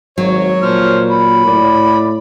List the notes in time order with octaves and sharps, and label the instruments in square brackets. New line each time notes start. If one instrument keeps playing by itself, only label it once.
[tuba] G#1 [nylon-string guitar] F#3 [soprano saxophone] C#5
[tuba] A#2 [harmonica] C5 F6
[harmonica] B5
[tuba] A2 [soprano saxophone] D5